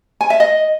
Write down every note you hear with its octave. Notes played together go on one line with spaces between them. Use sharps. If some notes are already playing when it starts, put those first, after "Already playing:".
G#5
E5
D#5